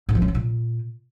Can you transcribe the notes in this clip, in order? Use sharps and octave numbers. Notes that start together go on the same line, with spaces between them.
A2
F3
C#4
F3
A#2